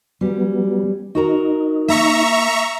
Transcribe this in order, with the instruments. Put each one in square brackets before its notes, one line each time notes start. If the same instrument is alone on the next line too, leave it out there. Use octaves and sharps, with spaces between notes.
[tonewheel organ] F#3 B3 [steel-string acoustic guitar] G3 C#4
[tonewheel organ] D#4 [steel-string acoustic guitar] F#4 A#4 A#5
[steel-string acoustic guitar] A#3 [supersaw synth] E5 A#5 C#6